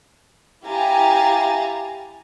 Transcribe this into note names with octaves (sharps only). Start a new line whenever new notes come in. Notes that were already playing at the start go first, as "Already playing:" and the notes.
E4 G4 F5 G#5 A#5 A6